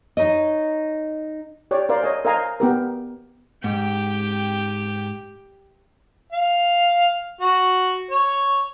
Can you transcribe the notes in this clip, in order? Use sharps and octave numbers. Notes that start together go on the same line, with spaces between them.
D#4 C#5 D#5
G4 C#5 D5
A#4 C5 D5 F5
C#5 D#5 G#5
A#4 C5 D#5 F5 G#5 A#5
B3 G4 A#4
G#2 G4 G5
F5
F#4
C#5